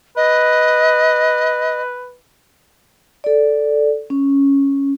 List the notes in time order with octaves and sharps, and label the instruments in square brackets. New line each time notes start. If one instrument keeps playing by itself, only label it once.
[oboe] B4 [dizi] D#5
[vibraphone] A4 D5
C#4